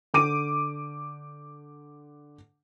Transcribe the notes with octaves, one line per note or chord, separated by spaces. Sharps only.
D3 D6 D#7